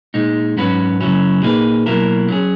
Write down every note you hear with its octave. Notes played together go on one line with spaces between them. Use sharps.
A#2 G#3 D#4
G#2 F#3 C#4 F#4 B4
F#2 C#3 F#3 C#4 E4
A#2 A#3 D#4 G#4 B4
B2 F#3 A#3 E4 A#4
F#3 C#4 G#4